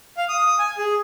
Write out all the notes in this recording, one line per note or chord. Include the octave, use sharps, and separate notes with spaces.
F5
D#6
G#5
G#4